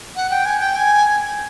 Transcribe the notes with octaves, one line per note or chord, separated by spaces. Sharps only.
F#5
G5
G#5
G5
G#5